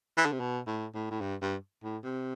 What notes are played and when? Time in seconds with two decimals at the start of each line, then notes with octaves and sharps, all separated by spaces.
0.18 E3
0.26 D3
0.32 C3
0.40 B2
0.67 A2
0.94 A2
1.11 A2
1.21 G2
1.42 G2
1.83 A2
2.04 C3